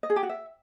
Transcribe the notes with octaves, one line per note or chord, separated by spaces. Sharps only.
D#5
G#4
G4
F#4
E5